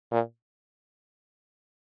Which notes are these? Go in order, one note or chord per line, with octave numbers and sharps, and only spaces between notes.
A#2